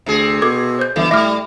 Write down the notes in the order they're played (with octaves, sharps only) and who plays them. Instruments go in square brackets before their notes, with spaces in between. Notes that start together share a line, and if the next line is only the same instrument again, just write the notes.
[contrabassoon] D2 [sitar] C3 G#4
[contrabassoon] B2 [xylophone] A4 D6 G#6
[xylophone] C5 G6
[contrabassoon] G1 [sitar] E3 [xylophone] A4 E5
[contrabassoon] A2 [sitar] G3 [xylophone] E5 D6 F6